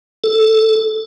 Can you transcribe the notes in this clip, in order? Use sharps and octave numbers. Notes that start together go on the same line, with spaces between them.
A4